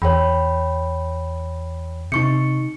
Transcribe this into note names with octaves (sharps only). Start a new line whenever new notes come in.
E2 C#5 G5 B5
C3 D#4 C#6 C#7